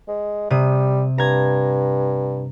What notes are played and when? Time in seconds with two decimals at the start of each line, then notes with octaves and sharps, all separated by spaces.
0.08 G#3
0.50 C3 G3 D#6
1.18 G2 A#5 G#6